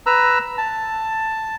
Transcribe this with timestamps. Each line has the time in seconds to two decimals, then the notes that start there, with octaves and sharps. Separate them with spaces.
0.06 B4 A#5 E6
0.58 A5